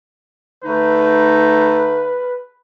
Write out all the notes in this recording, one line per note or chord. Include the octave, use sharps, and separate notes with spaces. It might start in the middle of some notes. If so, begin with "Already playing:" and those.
D3 A3 D#4 B4